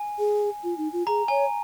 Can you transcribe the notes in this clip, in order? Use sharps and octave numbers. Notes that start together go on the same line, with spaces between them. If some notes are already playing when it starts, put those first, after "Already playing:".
Already playing: G#5
G#4
F4
D#4
F4
G#4 A#5
C#5 G#5